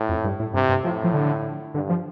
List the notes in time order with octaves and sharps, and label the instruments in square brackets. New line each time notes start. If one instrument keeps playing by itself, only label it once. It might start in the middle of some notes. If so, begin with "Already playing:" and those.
Already playing: [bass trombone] A2
[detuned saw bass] F2
G2
A2
[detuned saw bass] G2 [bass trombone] C3
[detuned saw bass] G2
[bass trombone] A2 [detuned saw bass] F3
[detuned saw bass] F3
D3
[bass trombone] G2 [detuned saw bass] D3
[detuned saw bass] F3